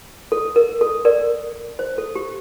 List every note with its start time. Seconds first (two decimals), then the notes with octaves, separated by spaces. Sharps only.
0.32 A4
0.56 A#4
0.81 A4
1.05 A#4 D5
1.79 C5
1.98 A4
2.15 G4